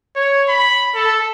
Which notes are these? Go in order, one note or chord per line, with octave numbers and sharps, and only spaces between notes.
C#5
B5
A4